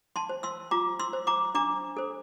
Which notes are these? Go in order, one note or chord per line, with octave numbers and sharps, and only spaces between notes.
A5 C6
C5
C6 E6
F4 A#5 D6
C6 E6
C5
A#5 D6
D4 A#5 D6
A4 C5